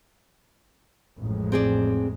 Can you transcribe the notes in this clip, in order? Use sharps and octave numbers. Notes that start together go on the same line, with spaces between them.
A1 F2 G#3
C4 G#4 D5